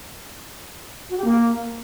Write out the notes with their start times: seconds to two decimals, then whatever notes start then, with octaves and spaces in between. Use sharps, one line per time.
1.09 F#4
1.16 G4
1.24 A#3